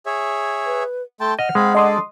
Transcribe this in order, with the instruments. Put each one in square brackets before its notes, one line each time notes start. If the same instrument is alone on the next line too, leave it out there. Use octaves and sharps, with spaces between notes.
[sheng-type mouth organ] G#4 C#5 E5
[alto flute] B4
[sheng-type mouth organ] A3 G5 A5 [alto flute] C6
[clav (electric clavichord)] D#5 [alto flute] F#5 [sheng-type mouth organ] F6
[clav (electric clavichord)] G#3 [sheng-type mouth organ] C4 F5 B5
[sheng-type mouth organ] D4 A4 D5 [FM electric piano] D#5 C6 D#6